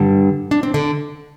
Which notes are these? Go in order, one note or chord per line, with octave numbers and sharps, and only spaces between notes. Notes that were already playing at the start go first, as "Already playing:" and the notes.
Already playing: G2 D3 G3
D4
C4
D3 D4